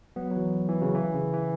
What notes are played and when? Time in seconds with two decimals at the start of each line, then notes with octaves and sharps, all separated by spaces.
0.16 F#3 B3
0.31 F#3
0.36 E3
0.69 E3
0.81 C#3 F#3
0.95 E3
1.14 C#3
1.33 E3